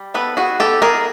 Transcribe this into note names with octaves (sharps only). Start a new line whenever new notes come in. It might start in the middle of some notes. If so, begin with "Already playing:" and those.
Already playing: G3
B3 A4 B4
F#4 G#4
B3 G4 A4
G#4 A#4